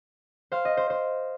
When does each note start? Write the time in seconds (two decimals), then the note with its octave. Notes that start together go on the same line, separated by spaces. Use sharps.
0.52 C5 F5
0.65 D#5
0.77 C5
0.90 C5